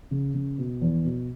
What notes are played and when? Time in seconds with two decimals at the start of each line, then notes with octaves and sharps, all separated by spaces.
0.11 C#3
0.34 C#3
0.58 B2
0.82 E2
1.05 B2